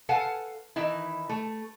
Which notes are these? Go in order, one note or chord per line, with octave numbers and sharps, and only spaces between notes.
A4 B4 F5 F#5 G#5 A5
D#3 E3 D#4 E4
A3